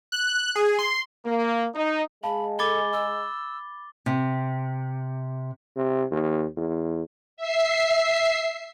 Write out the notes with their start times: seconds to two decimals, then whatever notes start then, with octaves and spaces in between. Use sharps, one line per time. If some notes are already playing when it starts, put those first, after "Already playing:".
0.12 F#6
0.56 G#4
0.79 C6
1.26 A#3
1.75 D#4
2.23 G#3 F5 A5 B5
2.59 A4 B5 D6 G#6 A6 G7
2.93 E6
4.06 C3
5.77 C3
6.11 D#2
6.57 E2
7.37 E5 C7